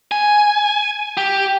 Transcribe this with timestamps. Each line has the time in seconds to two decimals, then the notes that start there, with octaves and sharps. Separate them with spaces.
0.12 G#5
1.17 G4